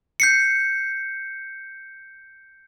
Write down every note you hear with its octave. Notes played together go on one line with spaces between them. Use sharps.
G6 C7 C#7